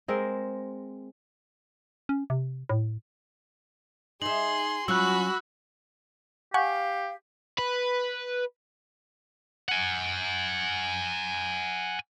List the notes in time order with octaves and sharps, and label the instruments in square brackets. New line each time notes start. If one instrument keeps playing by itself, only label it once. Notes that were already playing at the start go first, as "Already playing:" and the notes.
[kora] G#3 C4 A#4
[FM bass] C#4
C3
A2
[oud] D#4 E5 [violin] G#4 C6 [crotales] F#7
[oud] F#3 C#4 F4 [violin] F#4 B5 [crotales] E6 F#6
[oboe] G4 [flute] F5 [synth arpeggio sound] F#5 G#5 C#6
[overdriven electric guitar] B4
[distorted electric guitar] F#5 G#5